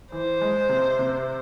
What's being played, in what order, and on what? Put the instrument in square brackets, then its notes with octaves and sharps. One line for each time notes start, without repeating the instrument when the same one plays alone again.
[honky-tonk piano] E3 [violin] C5
[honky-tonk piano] G#3
C3
C3